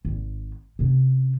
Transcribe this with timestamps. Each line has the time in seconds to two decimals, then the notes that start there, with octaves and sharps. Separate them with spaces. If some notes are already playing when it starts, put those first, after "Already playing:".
0.05 G#1
0.79 C3 C#4